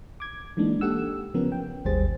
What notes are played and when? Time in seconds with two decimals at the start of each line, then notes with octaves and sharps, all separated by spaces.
0.20 D6 G#6
0.57 E3 G#3 A#3 D4 D#4
0.81 G4 A4 F#5 E6
1.34 C#3 F3 B3 C#4 A#4
1.52 G5
1.85 G#1 D#2 G3 G#4 C5 A6